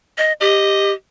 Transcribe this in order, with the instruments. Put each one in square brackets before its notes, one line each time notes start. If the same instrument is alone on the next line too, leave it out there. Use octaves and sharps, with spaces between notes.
[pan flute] D#5
[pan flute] G4 [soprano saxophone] D#5